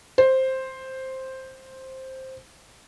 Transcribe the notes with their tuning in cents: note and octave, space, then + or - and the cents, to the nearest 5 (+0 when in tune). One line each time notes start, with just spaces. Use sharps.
C5 +5